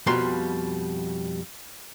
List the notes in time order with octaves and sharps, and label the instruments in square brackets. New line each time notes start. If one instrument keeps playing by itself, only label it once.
[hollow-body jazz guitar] F2 B2 G3 F4 A#5 C6